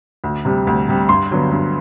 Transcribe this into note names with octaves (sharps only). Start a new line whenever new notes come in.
D2
C3 G3
D2
C3 G3
G2 C6
D3 F#3 B3
G2